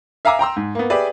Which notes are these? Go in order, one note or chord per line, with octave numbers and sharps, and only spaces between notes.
E5 F5 G#5 A#5 D6 E6
G5 A#5 C6 E6
G#2
A#3 B3
G4 G#4 B4 D5 E5